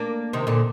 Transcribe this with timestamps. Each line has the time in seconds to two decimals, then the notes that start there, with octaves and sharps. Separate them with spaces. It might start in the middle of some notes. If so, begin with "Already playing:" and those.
Already playing: A#3 D4
0.33 C3 D#3
0.47 A#2 D3